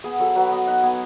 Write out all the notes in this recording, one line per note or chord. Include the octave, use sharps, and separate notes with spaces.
B3 G#4
F#3 A4
F#3 B4
B3 D#5
D#4 F#5
B3 G#5